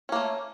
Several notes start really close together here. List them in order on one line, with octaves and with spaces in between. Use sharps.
C#4 A#3 A3